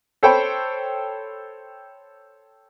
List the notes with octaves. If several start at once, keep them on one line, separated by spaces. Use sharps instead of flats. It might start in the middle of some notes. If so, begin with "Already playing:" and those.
A4 C5 C#5 G5 A5 B5